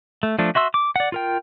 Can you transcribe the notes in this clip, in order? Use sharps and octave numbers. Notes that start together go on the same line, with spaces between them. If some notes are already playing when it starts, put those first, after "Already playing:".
A3
F3 A3 D4
F#4 E5 C6 E6
D6
D5 F#5
F4 A#4 G5